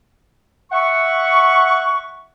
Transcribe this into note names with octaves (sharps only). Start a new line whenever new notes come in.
E5 F#5 C#6